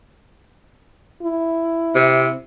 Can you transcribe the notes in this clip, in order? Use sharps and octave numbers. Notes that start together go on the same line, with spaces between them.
E4
C3